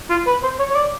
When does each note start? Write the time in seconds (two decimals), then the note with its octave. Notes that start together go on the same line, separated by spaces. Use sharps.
0.10 F4
0.27 B4
0.43 C5
0.59 C#5
0.70 C#5
0.75 D5